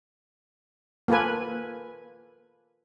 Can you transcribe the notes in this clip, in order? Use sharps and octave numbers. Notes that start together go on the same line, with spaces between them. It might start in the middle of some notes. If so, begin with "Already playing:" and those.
A#3 F4 A4 B4 G#5